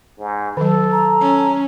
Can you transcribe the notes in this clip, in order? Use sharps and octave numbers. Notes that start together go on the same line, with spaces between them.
G#2
D#3 F#3 A4
A#5
C#4 A5